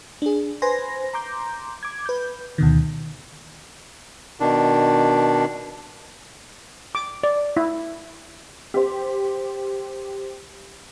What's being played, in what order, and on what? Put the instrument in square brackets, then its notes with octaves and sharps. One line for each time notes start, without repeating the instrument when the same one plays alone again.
[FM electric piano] D4 G#4
B4 C5 G#5 C6 A#6
A#5 C6 D6 G6
D6 G#6
B4 G6
D2 B2 D#3
[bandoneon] B2 D#3 D4
[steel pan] D6
D5
E4
[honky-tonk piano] G4 C5